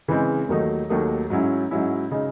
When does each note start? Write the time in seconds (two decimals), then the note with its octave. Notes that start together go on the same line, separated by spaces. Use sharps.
0.08 C#3 E3 G#3 C4
0.48 D#2 D#3 F#3 A3 D#4
0.90 D#2 D#3 F#3 A3 D#4
1.30 G#2 F#3 C#4 E4
1.71 G#2 F#3 C#4 E4
2.11 C#3 G#3 D#4